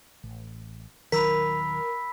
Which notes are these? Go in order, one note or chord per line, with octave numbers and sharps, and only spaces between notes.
A1
D#1 D#3 F#3 A#4 B5 E6 B6